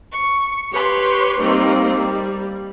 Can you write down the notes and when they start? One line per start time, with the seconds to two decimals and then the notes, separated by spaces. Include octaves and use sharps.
0.11 C#6
0.73 G4 B4 C#5 C6 G6
1.40 G3 A#3 C4 D#4
1.97 G3